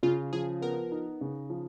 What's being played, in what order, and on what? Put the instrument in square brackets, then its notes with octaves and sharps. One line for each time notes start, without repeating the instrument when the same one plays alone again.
[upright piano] C#3 [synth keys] F4
[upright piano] F3 [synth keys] G#4
[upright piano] B3 [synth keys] A#4
[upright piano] D#4
C#3
F3